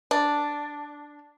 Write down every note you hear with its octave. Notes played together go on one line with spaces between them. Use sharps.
D4